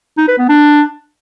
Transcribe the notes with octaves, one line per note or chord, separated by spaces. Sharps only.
D#4
B4
B3
D4